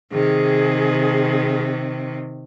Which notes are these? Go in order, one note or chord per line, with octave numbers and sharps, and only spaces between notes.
C3 D#3 G#4